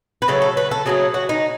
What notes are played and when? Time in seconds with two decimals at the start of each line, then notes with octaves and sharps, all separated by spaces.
0.22 B4
0.28 C#3 F#3 A3 A4
0.42 A4
0.57 B4
0.71 A4
0.86 C#3 F#3 A3 G#4
1.14 F#4
1.29 D#4